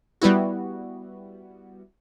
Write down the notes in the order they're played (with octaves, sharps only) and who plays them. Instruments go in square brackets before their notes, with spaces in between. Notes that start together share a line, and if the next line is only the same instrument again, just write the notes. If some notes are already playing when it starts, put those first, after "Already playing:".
[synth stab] G3 B3 E4 F#4